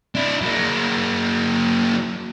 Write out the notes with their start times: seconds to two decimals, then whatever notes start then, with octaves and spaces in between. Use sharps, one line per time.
0.15 D4 E4
0.42 F#3 A#3